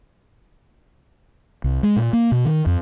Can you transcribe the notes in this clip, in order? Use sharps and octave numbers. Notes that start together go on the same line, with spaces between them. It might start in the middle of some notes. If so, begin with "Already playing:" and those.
C2
G#3
A#2
A#3
B2
D#3
F2